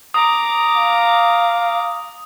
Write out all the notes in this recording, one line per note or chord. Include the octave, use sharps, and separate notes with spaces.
A#5 D6 D#6
F5